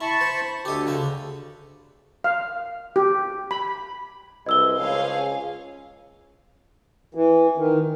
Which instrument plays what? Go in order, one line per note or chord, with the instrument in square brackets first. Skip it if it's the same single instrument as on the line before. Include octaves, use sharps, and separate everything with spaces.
[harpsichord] E4 [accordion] A5 B5 C#6
[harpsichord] C5
[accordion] D2 D3 [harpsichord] G4 D#5
[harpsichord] C#3 A4
[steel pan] F5
G4
B5
[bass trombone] C2 [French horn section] G#3 B4 [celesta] D#5 E6 G7
[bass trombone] C#2 [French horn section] F3 C#4 [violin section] G#4 C#5 F5
[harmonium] E3
D#3